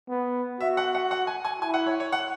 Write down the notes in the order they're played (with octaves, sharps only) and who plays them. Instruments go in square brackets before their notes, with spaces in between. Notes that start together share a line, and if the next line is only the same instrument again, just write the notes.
[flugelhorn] B3
[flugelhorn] F#4 [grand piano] E5
[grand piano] F#5
F#5
F#5
G#5
G#5
[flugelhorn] E4 [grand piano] G#5
[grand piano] F#5
C#5
C#5
F#5